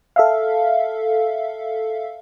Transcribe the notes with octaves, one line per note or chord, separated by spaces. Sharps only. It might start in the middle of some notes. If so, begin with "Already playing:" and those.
A4 E5 F5